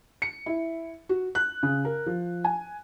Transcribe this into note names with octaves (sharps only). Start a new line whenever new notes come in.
C#7
E4
F#4
F#6
C#3
A#4
F3
G#5